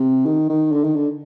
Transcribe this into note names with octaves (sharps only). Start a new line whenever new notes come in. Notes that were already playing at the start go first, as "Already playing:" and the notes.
Already playing: C3
D#3
D#3
D3
D#3
D3